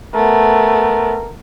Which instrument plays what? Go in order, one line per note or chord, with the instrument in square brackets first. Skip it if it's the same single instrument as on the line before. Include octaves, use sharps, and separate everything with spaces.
[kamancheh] A3 B3 [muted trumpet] A#4